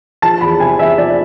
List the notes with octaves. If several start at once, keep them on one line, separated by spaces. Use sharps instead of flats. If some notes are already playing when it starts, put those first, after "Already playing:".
F3 A5
E2 B5
C3 G#5
E2 E5
F3 D5